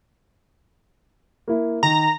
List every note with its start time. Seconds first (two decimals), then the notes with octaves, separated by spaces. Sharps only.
1.48 A#3 E4
1.83 D#3 A#5